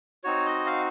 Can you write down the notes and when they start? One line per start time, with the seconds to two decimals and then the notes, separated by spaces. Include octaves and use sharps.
0.24 C4 D#4 F#4 C#5
0.46 D#5
0.67 F5